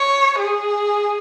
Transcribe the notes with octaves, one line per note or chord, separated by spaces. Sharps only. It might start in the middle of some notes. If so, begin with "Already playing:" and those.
Already playing: C#5
G#4